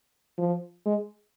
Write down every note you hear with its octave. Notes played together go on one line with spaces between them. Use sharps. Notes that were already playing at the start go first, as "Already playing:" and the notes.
F3
G#3